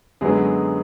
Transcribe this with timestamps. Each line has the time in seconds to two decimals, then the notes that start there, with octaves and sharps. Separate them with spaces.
0.21 F#2 D3 F#3 G#3 B3 G#4